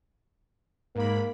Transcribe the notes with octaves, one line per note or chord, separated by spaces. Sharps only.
G#2 A#3 B5